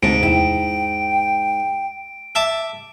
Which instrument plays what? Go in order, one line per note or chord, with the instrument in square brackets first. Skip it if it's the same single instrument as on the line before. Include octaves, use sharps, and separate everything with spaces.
[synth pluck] D2 C3 A5 [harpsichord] G#2 [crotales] D7
[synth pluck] E2 E4 E7 [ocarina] G5
[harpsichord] E5 A5 D6